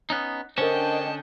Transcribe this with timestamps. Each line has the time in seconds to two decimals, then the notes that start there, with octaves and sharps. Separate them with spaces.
0.10 B3 C#4 D#4
0.58 D3 C#4 D4 A#4 C5 D#5 G5 A5